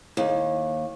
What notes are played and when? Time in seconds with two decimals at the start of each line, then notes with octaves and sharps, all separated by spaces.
0.17 D#2